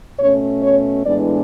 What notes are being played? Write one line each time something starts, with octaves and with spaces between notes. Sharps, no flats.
B2 A3 C#4 C#5
C#5
A2 E3 G#3 B3 D4 D5